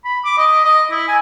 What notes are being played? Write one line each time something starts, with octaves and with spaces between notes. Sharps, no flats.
B5
D6
D#5
D#5
E4
G#5